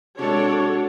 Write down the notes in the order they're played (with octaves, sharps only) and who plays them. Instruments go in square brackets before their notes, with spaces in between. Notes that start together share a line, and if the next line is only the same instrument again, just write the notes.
[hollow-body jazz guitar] C3 G#3 [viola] D4 [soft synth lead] F#4 [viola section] A4 C#5